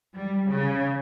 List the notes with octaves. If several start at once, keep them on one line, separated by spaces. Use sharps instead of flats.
G3
C#3